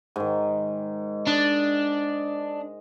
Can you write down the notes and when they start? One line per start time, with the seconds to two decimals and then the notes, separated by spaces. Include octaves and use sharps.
0.16 G#2 D#3
1.27 D4 D#5